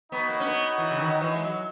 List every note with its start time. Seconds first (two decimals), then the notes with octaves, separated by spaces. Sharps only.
0.12 B3 D#4 F#4 C#5 F#5
0.29 A#3
0.40 C#4
0.45 B3
0.78 E3
0.91 C#3
1.00 D#3
1.21 E3
1.35 G#3
1.44 F#3